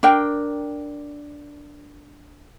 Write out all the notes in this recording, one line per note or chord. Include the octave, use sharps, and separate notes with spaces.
D4 A#4 G5